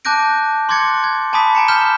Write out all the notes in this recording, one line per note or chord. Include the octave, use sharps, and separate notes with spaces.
A5 D6 F#6 G6 A#6 D7
C6 D6 F#6 G#6 A6 C#7
G#6
G#5 A5 B5 D6 D#6 B6
G#5 A#5 C#7
F6 G6 B6 E7 G7